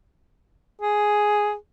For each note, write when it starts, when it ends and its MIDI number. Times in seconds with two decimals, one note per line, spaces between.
0.81 1.55 68